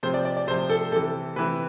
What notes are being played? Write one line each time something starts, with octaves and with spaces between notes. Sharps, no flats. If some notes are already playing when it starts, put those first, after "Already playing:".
C3 F3 C5
D5
D5
D5
C3 F3 C5
A4
C3 E3 A4
C3 E3 B4